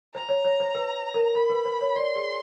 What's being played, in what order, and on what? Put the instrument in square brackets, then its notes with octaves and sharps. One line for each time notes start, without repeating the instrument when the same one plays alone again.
[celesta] C5 [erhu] A#5
[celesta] C#5
C#5
C5
B4
A#4
[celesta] A#4 [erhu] B5
[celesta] B4
C5
C#5
[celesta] D5 [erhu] C6
[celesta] G#4